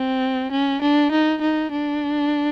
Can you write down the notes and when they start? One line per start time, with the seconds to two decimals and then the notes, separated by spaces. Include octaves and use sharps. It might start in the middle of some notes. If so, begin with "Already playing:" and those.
Already playing: C4
0.52 C#4
0.82 D4
1.12 D#4
1.41 D#4
1.71 D4